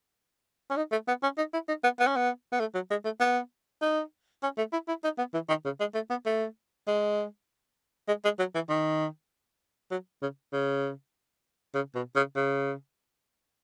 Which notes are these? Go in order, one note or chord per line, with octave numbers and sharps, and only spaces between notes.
C#4
D#4
A3
B3
C#4
D#4
E4
D#4
B3
B3
C#4
B3
B3
A3
F#3
G#3
A3
B3
D#4
C#4
A3
E4
E4
D#4
B3
E3
D#3
C#3
G#3
A3
B3
A3
G#3
G#3
G#3
F#3
E3
D#3
F#3
C#3
C#3
C#3
B2
C#3
C#3